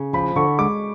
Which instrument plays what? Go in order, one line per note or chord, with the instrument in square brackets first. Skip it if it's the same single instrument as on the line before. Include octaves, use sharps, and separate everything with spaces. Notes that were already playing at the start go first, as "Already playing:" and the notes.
Already playing: [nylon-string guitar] C#3
[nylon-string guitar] F3 [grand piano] B5
[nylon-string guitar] D3 [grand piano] C#6
[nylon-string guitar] G#3 [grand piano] D6